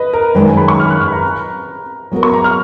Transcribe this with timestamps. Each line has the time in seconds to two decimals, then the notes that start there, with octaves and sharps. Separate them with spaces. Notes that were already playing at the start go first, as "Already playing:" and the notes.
Already playing: B4 D#5
0.13 A#4
0.35 F#2 D#3 G#3 B4
0.46 G#5
0.57 B5
0.68 C#6
0.79 F6
0.90 F#6
1.01 F6
1.08 B5
1.12 A#5
2.11 F#3 B3 F#4 A#4
2.23 C#6
2.34 A#5
2.44 F6